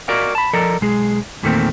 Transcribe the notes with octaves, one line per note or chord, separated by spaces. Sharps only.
F#4 A#4 D5 D#5 F5
A5 B5
F3 A4 A#4 D5 D#5
B1 G#3 G#4
E2 A#2 D#3 A3 A#3 C4